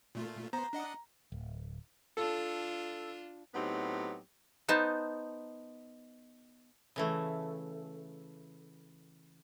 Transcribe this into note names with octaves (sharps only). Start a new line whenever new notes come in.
A#2 A3 F4
B3 C5 A#5
D4 D#5 F#5
D1
D4 F4 A4
A2 F#3 B3 C4 D#4 G4
B3 D#4 C5 A5
C#3 E3 A3